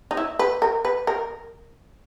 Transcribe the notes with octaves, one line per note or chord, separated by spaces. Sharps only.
D#4
E4
B4
A#4
B4
A#4